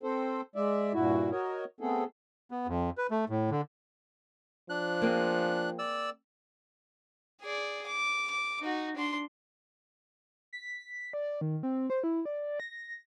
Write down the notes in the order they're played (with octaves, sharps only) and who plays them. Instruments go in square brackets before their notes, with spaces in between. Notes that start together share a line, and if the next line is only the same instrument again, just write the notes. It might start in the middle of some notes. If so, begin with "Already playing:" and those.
[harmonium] C4 A4 C5
G#3 D5 E5
G2 A#2 E4 F#4
F#4 A#4 C#5 D#5
A3 B3 C4 G#4 A4
[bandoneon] B3
F2
B4
A3
A2
D3
[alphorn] F3 [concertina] D4 F#6
[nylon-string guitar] A#3 C4 G#4
[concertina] D5 E6
[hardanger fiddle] G#4 D5
D6
D6
D#4 F#4
D4 C6
[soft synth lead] B6
D5
D#3
C4
C5
E4
D5
A#6